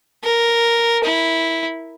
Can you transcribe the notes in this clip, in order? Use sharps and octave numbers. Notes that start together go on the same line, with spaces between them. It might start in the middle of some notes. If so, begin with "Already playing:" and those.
A#4
E4